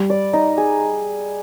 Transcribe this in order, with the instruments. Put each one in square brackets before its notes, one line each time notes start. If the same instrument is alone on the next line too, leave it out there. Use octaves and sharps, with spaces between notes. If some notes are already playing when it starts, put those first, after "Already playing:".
Already playing: [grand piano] G3
[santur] D5
D#4
G#4